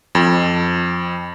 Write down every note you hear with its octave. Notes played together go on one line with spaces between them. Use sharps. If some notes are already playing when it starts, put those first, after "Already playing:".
F2